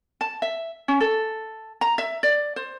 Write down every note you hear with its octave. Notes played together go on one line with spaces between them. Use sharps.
A5
E5
C#4
A4
A#5
E5
D5
C5